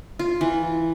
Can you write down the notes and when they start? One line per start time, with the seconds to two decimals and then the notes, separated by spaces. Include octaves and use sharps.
0.19 F4
0.41 E3